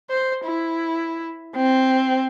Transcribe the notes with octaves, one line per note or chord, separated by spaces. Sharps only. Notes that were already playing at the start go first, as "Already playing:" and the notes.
C5
E4
C4